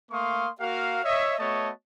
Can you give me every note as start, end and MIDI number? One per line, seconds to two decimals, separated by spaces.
0.11 0.48 57
0.11 0.48 58
0.11 0.48 77
0.11 0.48 84
0.11 0.48 85
0.11 0.48 87
0.60 0.99 58
0.60 0.99 66
0.60 0.99 70
0.60 0.99 77
1.05 1.36 73
1.05 1.36 75
1.05 1.36 76
1.39 1.71 57
1.39 1.71 59
1.39 1.71 66
1.39 1.71 73
1.39 1.71 75
1.39 1.71 81